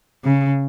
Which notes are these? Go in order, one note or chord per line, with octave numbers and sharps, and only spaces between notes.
C#3